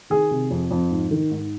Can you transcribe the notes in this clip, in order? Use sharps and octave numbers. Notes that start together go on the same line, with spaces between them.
D#3 G#4
C3
F2
F2
G#2
D#3
G#2